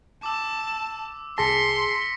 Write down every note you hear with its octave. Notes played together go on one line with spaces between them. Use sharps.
A5 D6 E6
C2 G#4 A5 C6 A#6 B6 C#7